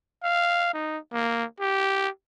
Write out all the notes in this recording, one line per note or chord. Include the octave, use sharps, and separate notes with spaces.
F5
D#4
A#3
G4